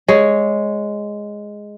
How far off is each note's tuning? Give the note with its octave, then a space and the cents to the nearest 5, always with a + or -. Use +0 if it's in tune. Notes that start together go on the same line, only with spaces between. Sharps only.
G#3 +0 C#5 +0